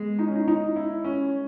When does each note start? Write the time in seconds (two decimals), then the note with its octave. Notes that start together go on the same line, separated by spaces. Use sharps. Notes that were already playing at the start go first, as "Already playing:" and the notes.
Already playing: G#3 B3
0.19 D#4
0.28 C#4
0.35 D#4
0.48 D#4
0.76 E4
1.05 C#4